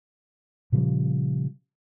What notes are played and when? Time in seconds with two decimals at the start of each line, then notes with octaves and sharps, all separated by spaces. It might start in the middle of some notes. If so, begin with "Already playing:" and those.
0.72 A#2 C#3 F3 G3